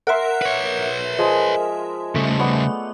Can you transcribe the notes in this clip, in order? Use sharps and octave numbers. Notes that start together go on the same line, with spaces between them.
A#4 E5 F#5 C6
B4 C#5
F3 G#3 G#4
C#3 G3 A3
B3 C#5 D5